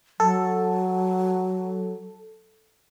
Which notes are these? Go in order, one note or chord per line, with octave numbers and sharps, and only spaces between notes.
F#3 A4